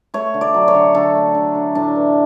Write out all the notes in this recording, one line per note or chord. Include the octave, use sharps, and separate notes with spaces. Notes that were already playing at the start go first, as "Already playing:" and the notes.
A3 C#5
D3
D5
F#3
C#5
D3
D3 A4
A3
D3
D3
A2 D4
E3